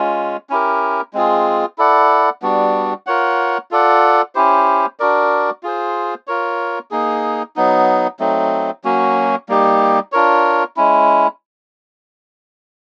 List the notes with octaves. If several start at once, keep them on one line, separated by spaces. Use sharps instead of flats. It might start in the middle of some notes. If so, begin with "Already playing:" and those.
Already playing: G#3 C#4 F4
C#4 E4 G4 A#4
G#3 C4 F4 G#4
E4 A4 D5 F#5
G3 B3 D4 F#4
F4 A#4 C#5 F#5
F4 A4 D5 F#5
C#4 E4 G4 C5
D4 F#4 A#4 D5
F4 G#4 C5
F4 A#4 C#5
A#3 D#4 G#4
F#3 B3 D#4
F#3 A3 C4 D#4
F#3 A#3 C#4 F#4
G3 A#3 D#4 G4
D4 F4 A#4 C#5
G#3 C#4 E4